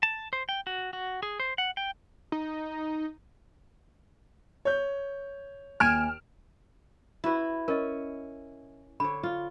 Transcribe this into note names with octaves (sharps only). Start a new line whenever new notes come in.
A5
C5
G5
F#4
F#4
G#4
C5
F#5
G5
D#4
C#5 G6
D#2 G#5 F6 D7 E7
E4 F#4 B4
C#4 A#4 D#5
D3 C#5 B5
F4